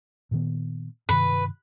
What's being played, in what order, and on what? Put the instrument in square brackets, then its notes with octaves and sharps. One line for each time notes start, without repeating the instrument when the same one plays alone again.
[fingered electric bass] A#2 D#3 B3
[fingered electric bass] G2 C3 D#3 [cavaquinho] B4